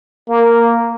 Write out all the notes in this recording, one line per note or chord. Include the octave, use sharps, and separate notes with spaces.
A#3